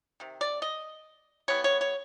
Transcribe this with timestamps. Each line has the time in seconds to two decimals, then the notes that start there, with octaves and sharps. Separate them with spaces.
0.20 C3 D#3
0.41 D5
0.62 D#5
1.48 E3 G3 B3 E4 C#5
1.64 C#5
1.81 C#5